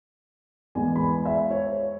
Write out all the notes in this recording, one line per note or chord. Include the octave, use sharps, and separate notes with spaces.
E2 E3 G#3 G#5
B5
G#5
E5
C#5